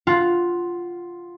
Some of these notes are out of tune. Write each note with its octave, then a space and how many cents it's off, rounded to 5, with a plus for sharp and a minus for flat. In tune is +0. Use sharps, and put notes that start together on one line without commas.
F4 +0 F#5 +10